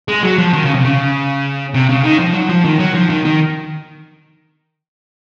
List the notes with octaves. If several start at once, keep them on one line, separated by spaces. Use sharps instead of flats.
G#3
F#3
F3
D#3
C#3
C3
C#3
C3
C#3
D#3
F3
F#3
F3
D#3
F#3
F3
D#3
D#3